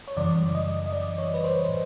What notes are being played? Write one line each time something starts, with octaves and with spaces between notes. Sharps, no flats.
C#5
F#2 C#3 E3 G3 D5
D#5
D#5
D5
C#5
B4
C5
A2